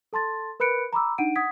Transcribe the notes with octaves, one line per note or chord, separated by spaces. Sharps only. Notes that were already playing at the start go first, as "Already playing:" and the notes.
A4 A5 C6 A6
A#4 B4 B5 F#6 C#7 D7
A#5 B5 D6 E6
D4 D#4 F#5 D7 D#7
F#5 D#6 G#6 B6